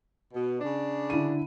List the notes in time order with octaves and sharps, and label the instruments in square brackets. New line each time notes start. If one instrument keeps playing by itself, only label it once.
[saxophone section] B2
C#3 D4
[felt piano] D3 E4 D#7